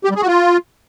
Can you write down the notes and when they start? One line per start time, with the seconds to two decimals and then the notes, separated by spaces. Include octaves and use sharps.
0.04 G4
0.10 G3
0.16 G#4
0.22 F#4
0.27 F4